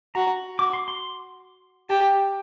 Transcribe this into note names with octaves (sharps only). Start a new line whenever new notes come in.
F#4 A#5
F#4 D6
C6
C6
G4 A5